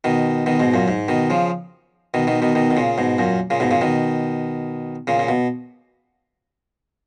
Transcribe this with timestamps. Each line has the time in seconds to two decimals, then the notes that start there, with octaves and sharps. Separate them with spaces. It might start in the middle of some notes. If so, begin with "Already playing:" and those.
0.04 B2 D#3
0.46 B2 D#3
0.60 G#2 B2
0.74 F#2 A#2
0.88 G#2
1.08 B2 D#3
1.30 C#3 F3
2.14 B2 D#3
2.27 B2 D#3
2.42 B2 D#3
2.55 B2 D#3
2.71 B2
2.77 A#2 C#3
2.98 G#2 B2
3.18 F#2 A#2
3.50 A#2 C#3
3.60 G#2 B2
3.71 A#2 C#3
3.81 B2 D#3
5.07 A#2 C#3
5.19 A#2
5.28 B2